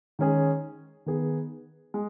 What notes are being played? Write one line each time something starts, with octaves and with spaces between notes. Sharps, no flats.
D#3 G#3 C#4 G#4
D#3 B3 G#4
G#3